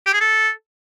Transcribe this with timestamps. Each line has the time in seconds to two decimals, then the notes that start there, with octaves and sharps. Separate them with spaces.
0.06 G4
0.13 G#4
0.21 A4